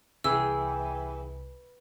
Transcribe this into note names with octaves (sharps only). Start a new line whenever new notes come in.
C2 E3 G#4 G5 E6